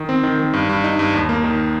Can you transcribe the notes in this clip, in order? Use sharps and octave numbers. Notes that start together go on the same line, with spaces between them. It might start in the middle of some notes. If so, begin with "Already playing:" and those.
Already playing: D#3
C4
D#3
D#3
G2
G2
D#4
G2
D#2
A#3
D#3